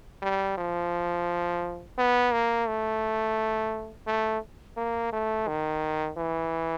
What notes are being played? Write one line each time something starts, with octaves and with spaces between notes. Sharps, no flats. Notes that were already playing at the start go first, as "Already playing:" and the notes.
G3
F3
B3
A#3
A3
A3
A#3
A3
D#3
E3